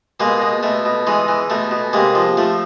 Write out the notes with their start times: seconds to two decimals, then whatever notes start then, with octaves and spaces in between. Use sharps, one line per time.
0.20 B2 G#3 A#3
0.42 B2
0.63 B2 A3
0.85 B2
1.07 E3 G#3
1.28 E3
1.50 B2 A3
1.71 B2
1.93 C3 G#3 A#3
2.15 F3
2.37 F3 A3